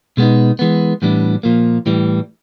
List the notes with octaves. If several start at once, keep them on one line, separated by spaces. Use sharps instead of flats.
B2 G#3 B3 D#4
E3 G#3 B3
A2 E3 G3 B3 D4
A#2 F3 A#3
A2 E3 G3